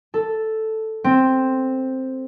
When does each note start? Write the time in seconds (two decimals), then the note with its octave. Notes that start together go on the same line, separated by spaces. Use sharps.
0.14 A4
1.04 C4